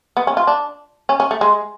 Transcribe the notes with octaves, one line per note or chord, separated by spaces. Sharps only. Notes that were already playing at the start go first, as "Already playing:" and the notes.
B3
C#4
F4
D4
C#4
C#4
A3
G#3